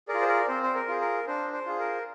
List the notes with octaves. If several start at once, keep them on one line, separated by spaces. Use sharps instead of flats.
G#4 A#4 D5
F4
C5
A#4 D5
C4 C5
C5
A#4
F4 G#4
A#4
D4 C5
C5
F4 G#4
A#4